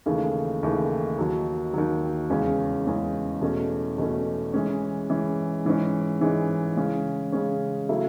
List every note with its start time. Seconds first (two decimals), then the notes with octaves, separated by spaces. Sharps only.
0.06 D#2 C#3 E3 A3
0.63 D#2 C#3 E3 A3
1.18 D#2 D#3 F#3
1.73 D#2 D#3 F#3
2.30 E2 C#3 G#3 C#4
2.86 E2 C#3 G#3 C#4
3.41 E2 B2 A3 C#4
3.98 E2 B2 A3 C#4
4.53 E3 G#3 C#4
5.10 E3 G#3 C#4
5.65 G#2 E3 G#3 C#4
6.21 G#2 E3 G#3 C#4
6.77 C#3 G#3 C#4
7.32 C#3 G#3 C#4
7.89 C#3 F#3 A3 E4